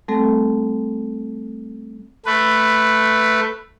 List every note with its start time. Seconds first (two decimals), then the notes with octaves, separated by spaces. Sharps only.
0.08 G3 A3 C4 A4
2.26 A3 B4